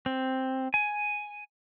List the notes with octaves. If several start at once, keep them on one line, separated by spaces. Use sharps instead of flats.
C4
G#5